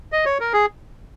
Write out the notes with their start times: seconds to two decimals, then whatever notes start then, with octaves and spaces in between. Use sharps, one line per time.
0.12 D#5
0.25 C#5
0.40 A#4
0.53 G#4